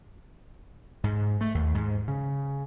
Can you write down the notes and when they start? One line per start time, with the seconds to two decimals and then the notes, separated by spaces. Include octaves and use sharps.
1.04 G#2
1.41 A3
1.55 D#2
1.75 G#2
2.08 C#3